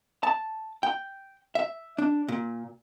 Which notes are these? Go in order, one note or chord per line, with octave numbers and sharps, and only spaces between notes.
A5
G5
E5
D4
A#2